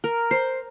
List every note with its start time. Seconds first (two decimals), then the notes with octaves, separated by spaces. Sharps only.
0.04 A#4
0.31 C5